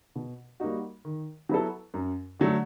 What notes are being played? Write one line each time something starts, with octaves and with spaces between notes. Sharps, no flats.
B2
G3 A#3 D#4 F#4
D#3
F#3 B3 E4 A4
F#2
D3 F#3 A3